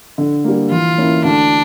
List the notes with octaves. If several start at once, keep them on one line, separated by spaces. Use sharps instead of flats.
D3
G3 A#3
E3 F4
A#3 C#4 E4
D2 D4